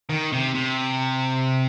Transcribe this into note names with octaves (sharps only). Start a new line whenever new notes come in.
D#3
C3
C3